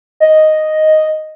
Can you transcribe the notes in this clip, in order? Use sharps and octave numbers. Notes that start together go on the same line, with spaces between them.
D#5